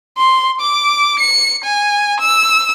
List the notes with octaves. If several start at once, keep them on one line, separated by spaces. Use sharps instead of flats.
C6
D6
C#7
G#5
E6